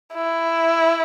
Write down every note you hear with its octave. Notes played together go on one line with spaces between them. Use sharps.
E4